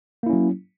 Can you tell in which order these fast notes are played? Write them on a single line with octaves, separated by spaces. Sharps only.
A#3 E4 C#4 F#3